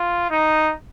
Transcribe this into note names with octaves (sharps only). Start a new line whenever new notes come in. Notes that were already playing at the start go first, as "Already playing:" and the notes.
Already playing: F4
D#4